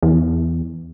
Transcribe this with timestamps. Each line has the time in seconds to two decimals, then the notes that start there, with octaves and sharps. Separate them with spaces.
0.03 E2